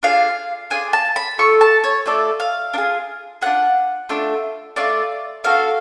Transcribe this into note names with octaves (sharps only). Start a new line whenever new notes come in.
D4 F4 G#4 F5
D4 F4 G#4 G#5
A5
B5
A3 F4 A4 C#6
A5
C#5
A3 F4 A4 D5
F5
D4 F4 G#4
D4 F4 G#4 F#5
A3 D4 F4
A3 D4 F4 D5
B3 D4 F#4 A4 F5